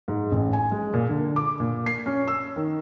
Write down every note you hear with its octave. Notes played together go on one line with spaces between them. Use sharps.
G#2
A1
G#5
G#3
A#2
D3
D6
A#2
C7
C#4
E6
D#3